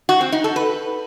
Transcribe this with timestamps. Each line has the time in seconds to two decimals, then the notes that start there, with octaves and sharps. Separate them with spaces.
0.09 F#4
0.21 C4
0.32 D#4
0.44 A4
0.56 B4